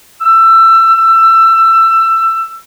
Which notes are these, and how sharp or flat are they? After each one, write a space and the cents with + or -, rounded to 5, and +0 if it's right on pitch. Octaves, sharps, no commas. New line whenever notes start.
E6 +20